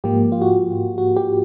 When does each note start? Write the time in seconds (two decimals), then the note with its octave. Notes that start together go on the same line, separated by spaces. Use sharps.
0.04 G#2 F3 A#3 G4
0.32 F4
0.42 F#4
0.98 F#4
1.17 G4